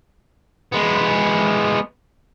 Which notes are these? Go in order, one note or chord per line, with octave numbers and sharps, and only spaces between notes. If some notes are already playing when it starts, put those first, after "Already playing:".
G#3 B3